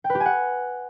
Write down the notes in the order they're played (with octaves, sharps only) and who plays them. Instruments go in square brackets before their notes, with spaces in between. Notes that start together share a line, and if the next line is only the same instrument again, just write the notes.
[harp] G5
B4
G4
G#5
F#5